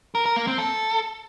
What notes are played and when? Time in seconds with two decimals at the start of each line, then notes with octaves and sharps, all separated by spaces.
0.15 A#4
0.26 A#4
0.36 A#3
0.47 C4
0.58 A4